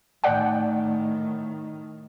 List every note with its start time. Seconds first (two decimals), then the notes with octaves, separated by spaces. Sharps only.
0.24 A2 D#3 D5 F#5 G5